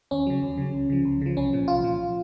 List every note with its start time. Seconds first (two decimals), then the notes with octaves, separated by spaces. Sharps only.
0.11 D#2 C#4
0.27 C#3 F#3
0.42 D#2
0.58 C#3 F#3
0.74 C#2
0.90 C#3 F3
1.05 C#2
1.21 C#3 F3
1.37 C2 C#4
1.53 A#2 F3
1.68 C2 F4
1.83 A#2 F3